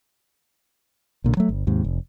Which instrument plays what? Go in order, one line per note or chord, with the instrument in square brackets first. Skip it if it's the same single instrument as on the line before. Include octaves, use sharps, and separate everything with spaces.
[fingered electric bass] B1 A#2 D3
F#3 A3
G1
D#2 G#2 C3
F1